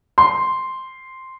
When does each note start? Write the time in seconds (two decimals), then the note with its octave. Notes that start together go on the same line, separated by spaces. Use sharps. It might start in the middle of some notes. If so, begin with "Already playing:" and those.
0.18 C6